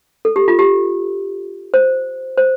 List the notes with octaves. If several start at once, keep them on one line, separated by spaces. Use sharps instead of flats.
A4
G4
F4
G4
C5
C5